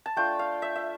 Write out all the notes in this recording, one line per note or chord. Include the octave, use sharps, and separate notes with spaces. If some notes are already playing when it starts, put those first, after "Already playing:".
A5
A3 D4 F4 G5
F5
E5
E5